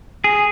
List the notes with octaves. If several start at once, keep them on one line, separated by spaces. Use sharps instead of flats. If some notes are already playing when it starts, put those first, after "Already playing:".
G#4